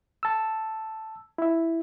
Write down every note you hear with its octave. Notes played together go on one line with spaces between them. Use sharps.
A5 E6
E4 E5